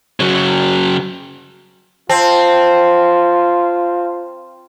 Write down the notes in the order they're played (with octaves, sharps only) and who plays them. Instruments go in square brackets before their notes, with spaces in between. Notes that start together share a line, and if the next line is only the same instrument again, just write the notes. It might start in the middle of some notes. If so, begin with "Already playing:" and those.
[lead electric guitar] C#3 F#3
[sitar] C4 [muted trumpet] F4 [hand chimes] A5